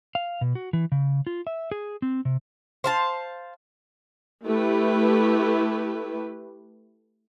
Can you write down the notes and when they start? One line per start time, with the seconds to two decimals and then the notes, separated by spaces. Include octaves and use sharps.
0.15 F5
0.41 B2
0.55 F#4
0.73 E3
0.92 C#3
1.27 F4
1.47 E5
1.71 G#4
2.02 C4
2.25 C3
2.84 C5 F5 A5
4.46 A3 E4 G4 B4